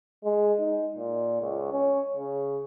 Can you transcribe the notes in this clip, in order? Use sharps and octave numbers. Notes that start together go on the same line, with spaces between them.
G#3
D#4
A#2
C#2
C#4
C#3